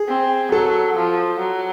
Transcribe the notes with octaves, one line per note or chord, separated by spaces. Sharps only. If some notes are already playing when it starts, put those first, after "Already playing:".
Already playing: G#4
C4
F#3 A4
F3
F#3